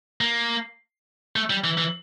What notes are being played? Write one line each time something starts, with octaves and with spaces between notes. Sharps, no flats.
A#3
A3
G3
E3
E3